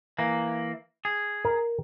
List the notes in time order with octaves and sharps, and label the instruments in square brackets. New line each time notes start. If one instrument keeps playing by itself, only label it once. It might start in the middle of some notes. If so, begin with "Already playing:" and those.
[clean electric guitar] E3 A#3
G#4
[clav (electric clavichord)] A#4